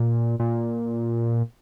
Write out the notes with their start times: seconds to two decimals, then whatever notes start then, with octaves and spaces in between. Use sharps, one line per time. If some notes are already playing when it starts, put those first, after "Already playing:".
Already playing: A#2
0.40 A#2